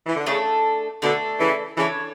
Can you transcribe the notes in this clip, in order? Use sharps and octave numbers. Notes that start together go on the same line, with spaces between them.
E3
D3
C#3 A3 D4 A4
B2 D3 A3 D4 A4
C#3 E3
C#3 E3 D4 A4 C#5